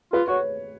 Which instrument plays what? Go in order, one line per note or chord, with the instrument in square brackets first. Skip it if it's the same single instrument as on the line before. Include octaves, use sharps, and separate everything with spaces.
[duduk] F4 [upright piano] B4
[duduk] F#4 [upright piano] C#5